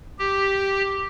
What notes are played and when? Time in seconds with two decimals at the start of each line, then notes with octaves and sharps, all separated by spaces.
0.19 G4